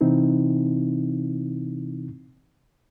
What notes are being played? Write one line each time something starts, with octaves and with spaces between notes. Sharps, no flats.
C3 E3 C4 D#4 E4